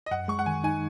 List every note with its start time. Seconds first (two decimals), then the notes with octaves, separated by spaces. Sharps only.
0.06 D#5
0.11 F#2 F#5
0.28 G#3 C#6
0.39 F#5
0.46 D#3 G#5
0.64 D#4 G#5